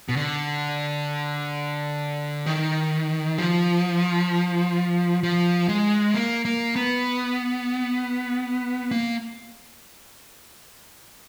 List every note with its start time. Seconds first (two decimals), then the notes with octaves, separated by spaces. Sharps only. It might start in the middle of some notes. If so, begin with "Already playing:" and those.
0.09 B2
0.17 D3
2.46 D#3
3.38 F3
5.23 F3
5.69 G#3
6.14 A#3
6.45 A#3
6.76 B3
8.91 A#3